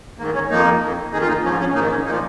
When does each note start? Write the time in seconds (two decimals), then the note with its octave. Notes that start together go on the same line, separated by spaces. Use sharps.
0.19 G#2 D#3 A#3
0.34 C#4
0.50 F2 F3 A#3 D#4
0.82 F2 D#3
1.12 F2 D#3 D#4 G#4
1.21 F4
1.28 A#3 D#4
1.44 F3 C#4
1.47 G#2
1.60 C#4
1.75 G#2 A#3 D#4
1.78 D#3
1.86 D#4
1.90 C#4
2.06 A#2 F3 A#3 D#4